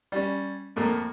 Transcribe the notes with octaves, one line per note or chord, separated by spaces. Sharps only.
G3 C#4
F2 A2 A3 A#3